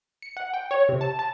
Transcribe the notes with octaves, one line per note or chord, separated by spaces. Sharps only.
C#7
F#5
G5
C#5
C3
A5
A5